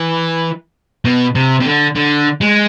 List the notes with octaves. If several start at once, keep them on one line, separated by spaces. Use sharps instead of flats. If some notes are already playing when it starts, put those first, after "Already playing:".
Already playing: E3
B2
C3
C3
D3
D3
G#3